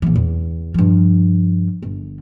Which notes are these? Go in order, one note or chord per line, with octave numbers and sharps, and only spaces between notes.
A#1 E3
E2
G2 F3
G1